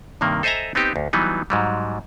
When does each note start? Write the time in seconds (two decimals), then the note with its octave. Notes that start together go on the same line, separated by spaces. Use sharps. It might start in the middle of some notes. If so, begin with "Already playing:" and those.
0.21 G2 C3 D#3 A#3
0.43 A4 C5 D#5 E5 G#5 A#5
0.75 B3 C4 D#4 G4
0.96 D2
1.13 E3 F#3 G3 B3 D#4
1.50 G#2 F#3 G3